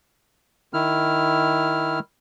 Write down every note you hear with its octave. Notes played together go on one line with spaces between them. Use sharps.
D#3 E4 F6